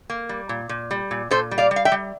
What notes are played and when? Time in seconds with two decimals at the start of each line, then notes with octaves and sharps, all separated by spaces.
0.10 A#3
0.29 G3
0.49 A#2
0.69 A#2
0.91 G3
1.11 A#2
1.31 A#2 A4 C5
1.51 G3
1.58 D5 F5
1.71 G3
1.76 F5
1.85 E5 G5
1.92 G3